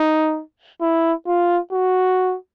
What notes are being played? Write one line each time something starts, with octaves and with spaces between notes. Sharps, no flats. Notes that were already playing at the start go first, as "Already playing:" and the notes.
Already playing: D#4
E4
F4
F#4